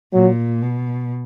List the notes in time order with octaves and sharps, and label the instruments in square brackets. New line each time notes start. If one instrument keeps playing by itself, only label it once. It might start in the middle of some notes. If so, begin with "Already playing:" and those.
[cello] A#2 [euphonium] F#3
[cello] B2